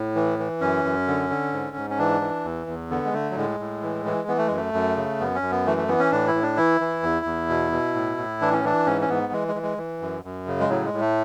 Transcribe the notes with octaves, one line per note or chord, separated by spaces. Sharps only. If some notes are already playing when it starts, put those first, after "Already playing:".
Already playing: A2
E3
E3
F#2 C#4
F#2
D3
D3
G#2
G#2
C#4
E3 D4
E3
E2
E2
D3 B3
G#3
D3 A3
F#3
A2 G#3
A2
E3
E3
E3 B3
A3
F#2 G#3
A3
F#2
C#3
F#2 B3
C#4
F#2
B3
E3 A3
A3
E3 B3
C#4
A2 D4
E4
A2
D4
E3 E4
E3
E2
E2
B2
B2
A2
A2
E3 D4
C#4
E3 D4
G#2 C#4
C#4
G#2 B3
E3 G#3
G#3
E3
G#3
E3
F#2
F#2
C#3
G#3
A2 F#3
G#3
A2
A3